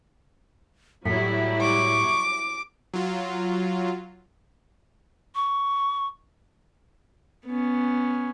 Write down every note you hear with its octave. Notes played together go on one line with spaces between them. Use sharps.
A2 F#3 G3 E4 B6
C#6 D6
F#3 F4
C#6
B3 C#4